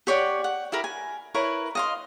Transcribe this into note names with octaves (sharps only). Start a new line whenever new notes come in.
G4 C#5 D5 F#5
F#5
E4 G4 A#4 B5
G#5
E4 A#4 B4 C#5
D#5 F5 C6